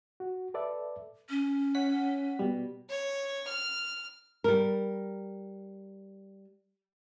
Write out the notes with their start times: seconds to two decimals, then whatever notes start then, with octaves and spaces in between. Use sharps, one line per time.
0.20 F#4
0.54 A4 B4 D5 E5
1.29 C#4
1.75 C#5 F#5 B6
2.39 B2 G3
2.89 C#5
3.49 F6
4.44 G3 A#4